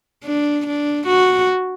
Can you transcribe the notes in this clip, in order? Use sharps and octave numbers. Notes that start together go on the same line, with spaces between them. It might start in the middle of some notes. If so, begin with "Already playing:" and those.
D4
D4
F#4